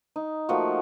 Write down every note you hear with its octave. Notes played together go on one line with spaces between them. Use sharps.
D#4
F3 A3 A#3 F#4